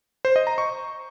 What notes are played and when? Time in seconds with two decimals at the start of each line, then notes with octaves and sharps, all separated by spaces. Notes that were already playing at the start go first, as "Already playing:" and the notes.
0.25 C5
0.36 D#5
0.47 A#5
0.58 C#6